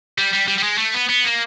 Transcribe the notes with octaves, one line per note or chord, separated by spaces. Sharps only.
G3
G3
G3
G3
G#3
A3
B3
B3
A#3